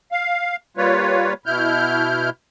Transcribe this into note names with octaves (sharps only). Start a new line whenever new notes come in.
F5
G3 A#3 F4 B4 C#5
B2 E4 F6 G6